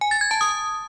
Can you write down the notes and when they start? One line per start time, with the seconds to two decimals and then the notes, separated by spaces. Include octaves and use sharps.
0.01 G#5
0.11 A6
0.21 G#6
0.31 A5
0.41 D#6